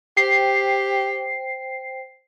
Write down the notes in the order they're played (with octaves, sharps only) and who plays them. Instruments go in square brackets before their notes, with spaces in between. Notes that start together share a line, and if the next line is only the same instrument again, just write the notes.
[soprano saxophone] G4 [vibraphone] C5 G5 [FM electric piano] C7